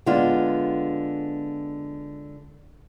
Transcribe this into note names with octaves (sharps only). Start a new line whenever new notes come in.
D3 G#3 B3 F4